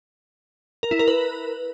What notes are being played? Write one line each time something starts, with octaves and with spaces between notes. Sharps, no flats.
A#4
E4
A#4
B4